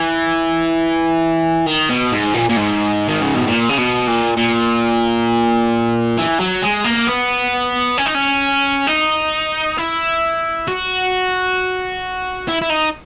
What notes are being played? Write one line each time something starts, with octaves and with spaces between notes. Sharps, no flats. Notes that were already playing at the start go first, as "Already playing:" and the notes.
Already playing: E3
D#3
B2
G#2
A#2
A#2
G#2
D#3
C#3
B2
A#2
C#3
B2
A#2
A#2
E3
F#3
G#3
A#3
B3
C#4
D#4
C#4
D#4
E4
F#4
E4
E4
D#4